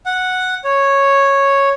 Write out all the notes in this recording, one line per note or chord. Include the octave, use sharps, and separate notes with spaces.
F#5
C#5